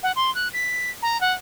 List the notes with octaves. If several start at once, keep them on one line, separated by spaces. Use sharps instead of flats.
F#5
C6
F#6
B6
A#5
F#5